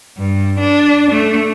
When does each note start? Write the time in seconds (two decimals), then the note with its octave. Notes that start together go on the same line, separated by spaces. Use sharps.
0.18 G2
0.59 D4
1.11 A3